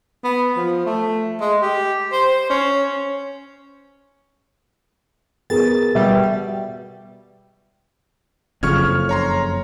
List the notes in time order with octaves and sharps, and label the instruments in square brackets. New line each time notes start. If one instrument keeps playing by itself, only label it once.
[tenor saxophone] B3
F3
A3
G#3
G4
C5
C#4
[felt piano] B3 G#4 A#4 [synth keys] A6
[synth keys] B2 G3 [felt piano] E5
[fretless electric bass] F#1 F2 C#3 [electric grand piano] C#6 F6 G#6
[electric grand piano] C#5 A#5 C6